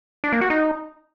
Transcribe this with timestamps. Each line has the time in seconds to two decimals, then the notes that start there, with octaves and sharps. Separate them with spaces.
0.24 D4
0.32 A#3
0.41 F#4
0.50 D#4